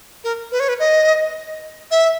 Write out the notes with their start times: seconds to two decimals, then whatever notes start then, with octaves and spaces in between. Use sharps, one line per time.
0.24 A#4
0.52 B4
0.60 C#5
0.69 B4
0.79 D#5
1.91 E5